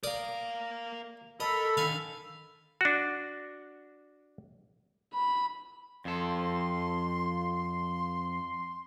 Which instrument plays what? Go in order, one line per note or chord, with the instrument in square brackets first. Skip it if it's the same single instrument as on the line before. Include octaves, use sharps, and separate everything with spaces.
[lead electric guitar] A#4 F5 [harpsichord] D5 D#6
[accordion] A4 B5 [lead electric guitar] A#4 [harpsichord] D#5
[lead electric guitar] D3 D#3 [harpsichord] F5 G#5
[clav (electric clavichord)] D4 F#4
[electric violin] B5
[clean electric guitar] F2 A4 [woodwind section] C6